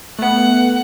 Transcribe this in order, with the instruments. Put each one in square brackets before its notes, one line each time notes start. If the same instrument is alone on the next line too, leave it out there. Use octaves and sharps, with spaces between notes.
[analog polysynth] A3 B3 [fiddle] F#5